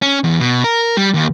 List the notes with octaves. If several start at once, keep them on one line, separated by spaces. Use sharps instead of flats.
C#4
E2
B2
A#4
G3
D#2